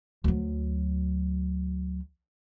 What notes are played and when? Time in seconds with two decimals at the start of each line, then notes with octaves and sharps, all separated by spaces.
0.24 D2 F#3